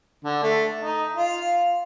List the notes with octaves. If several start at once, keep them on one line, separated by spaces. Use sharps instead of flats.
D3
A3
D#4
F4